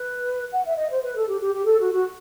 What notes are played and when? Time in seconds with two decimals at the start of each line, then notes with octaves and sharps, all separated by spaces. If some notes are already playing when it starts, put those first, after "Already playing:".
Already playing: B4
0.52 F#5
0.65 E5
0.78 D#5
0.90 C5
1.03 B4
1.16 A4
1.29 G4
1.41 G4
1.54 G4
1.67 A4
1.80 F#4
1.92 F#4